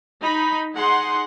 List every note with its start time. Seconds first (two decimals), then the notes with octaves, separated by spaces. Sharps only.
0.20 D#4 B5
0.74 D#4 G#4 F#5 C6